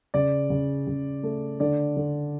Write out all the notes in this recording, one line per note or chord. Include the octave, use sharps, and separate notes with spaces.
C#3 D5
C#3
C#3
A3
D3 D5
D3